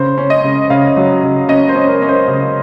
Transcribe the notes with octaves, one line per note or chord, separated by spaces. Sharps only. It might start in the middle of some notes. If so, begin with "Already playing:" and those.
Already playing: C#3 C5
C#4
D#5
C#3
C#3 F5
F#3
C#3
C#4 D#5
C5
C#4
A#4
C#4
C5
C#3